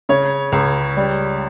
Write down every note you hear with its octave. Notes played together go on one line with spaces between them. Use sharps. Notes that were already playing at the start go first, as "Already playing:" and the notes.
C#3 C#5
C#2
G3